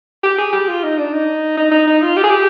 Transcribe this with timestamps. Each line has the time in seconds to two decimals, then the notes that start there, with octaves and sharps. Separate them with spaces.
0.24 G4
0.38 G#4
0.53 G4
0.68 F4
0.83 D#4
0.98 D4
1.13 D#4
1.57 D#4
1.72 D#4
1.87 D#4
2.02 F4
2.17 G4
2.24 G#4
2.31 G4